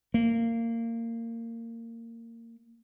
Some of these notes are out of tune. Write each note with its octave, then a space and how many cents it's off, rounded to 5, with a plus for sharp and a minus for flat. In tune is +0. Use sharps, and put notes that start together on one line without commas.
A#3 -20